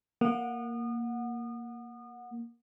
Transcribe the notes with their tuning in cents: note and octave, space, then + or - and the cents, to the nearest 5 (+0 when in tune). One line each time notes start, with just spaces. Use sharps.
A#3 +0 F#5 -20 D#6 -35